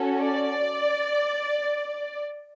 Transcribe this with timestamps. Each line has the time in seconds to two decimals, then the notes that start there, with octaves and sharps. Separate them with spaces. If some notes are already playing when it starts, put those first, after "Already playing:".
Already playing: C#4 F#4 A4
0.21 D5